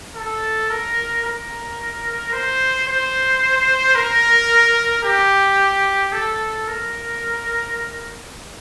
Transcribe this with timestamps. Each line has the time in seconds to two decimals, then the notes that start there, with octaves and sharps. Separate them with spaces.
0.15 A4
0.70 A#4
1.23 A#4
2.33 C5
2.87 C5
3.95 A#4
5.04 G4
6.13 A4
6.68 A#4